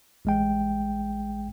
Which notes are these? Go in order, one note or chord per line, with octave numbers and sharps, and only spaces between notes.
A1 G#3 G5